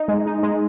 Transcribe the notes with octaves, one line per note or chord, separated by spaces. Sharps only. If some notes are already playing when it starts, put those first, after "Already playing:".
Already playing: D#4
G#3
D#4
G#3